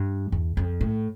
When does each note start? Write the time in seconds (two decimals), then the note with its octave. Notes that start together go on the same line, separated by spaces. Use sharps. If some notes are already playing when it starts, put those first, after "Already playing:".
Already playing: G2
0.32 E2
0.57 F2
0.81 A2